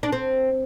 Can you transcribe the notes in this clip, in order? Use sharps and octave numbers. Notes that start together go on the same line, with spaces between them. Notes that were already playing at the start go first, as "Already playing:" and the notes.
D4
C4